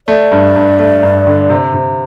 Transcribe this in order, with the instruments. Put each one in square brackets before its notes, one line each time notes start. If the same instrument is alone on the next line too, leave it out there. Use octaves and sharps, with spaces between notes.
[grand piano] A3 [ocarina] D5
[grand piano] G2
G2
A3
G2
D3
C3
C3